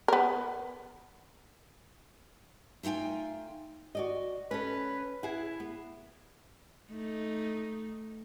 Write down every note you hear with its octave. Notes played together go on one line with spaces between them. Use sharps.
B3 A#4
A3 D#4 F4 G5 G#5
F#4 D5 D#5
C#4 A4 B4
E4 G#4 F#5
B3
A3 D#4